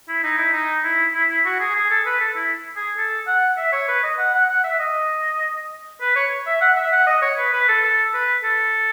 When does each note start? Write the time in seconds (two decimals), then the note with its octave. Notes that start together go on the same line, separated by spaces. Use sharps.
0.09 E4
0.23 D#4
0.38 E4
0.53 D#4
0.84 E4
1.14 E4
1.29 E4
1.45 F#4
1.60 G#4
1.75 G#4
1.90 A4
2.06 B4
2.20 A4
2.36 E4
2.76 G#4
2.97 A4
3.27 F#5
3.57 E5
3.72 C#5
3.88 B4
4.03 D#5
4.19 F#5
4.34 F#5
4.49 F#5
4.64 E5
4.79 D#5
6.01 B4
6.15 C#5
6.47 E5
6.61 F#5
6.77 E5
6.92 F#5
7.07 D#5
7.22 C#5
7.38 B4
7.53 B4
7.68 A4
7.84 A4
8.14 B4
8.44 A4